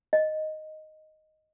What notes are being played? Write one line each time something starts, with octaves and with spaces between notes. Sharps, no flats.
D#5